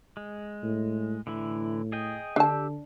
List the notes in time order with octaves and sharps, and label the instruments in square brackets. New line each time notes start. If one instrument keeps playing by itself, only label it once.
[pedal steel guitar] G#3
[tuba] A2
[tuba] A2 [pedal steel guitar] D3 E3 E4
[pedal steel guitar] G#4 D#5 G5
[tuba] D3 [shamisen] D4 A5 [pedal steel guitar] G4 E6 G6